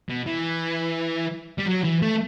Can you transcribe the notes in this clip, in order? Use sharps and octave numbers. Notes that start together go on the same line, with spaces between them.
B2
E3
G3
F#3
E3
A3